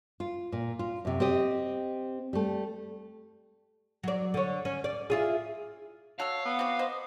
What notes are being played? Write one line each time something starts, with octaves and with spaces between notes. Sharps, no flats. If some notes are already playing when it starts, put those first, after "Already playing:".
F4
A#2
F4
F#2 C3
C4 G4 D#5
G3 A3
F#3 D5
D3 C#5
C#4
D5
E4 F4 G#4
F#4 A4 C#5 F5 A5 E6
B3
C4 F#4 D6
C5 D#5